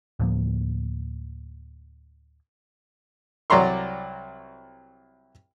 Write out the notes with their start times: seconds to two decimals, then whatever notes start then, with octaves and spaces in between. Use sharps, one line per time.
0.20 D2 A2 F3 A#3
3.50 C2 F#3 D5 A#5 C6 C#6